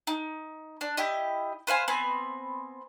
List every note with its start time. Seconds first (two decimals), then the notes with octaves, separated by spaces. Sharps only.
0.07 D#4
0.81 D4
0.97 E4 G4 D#5
1.67 B4 C5 F5 G#5
1.88 B3 C4 G#5 B5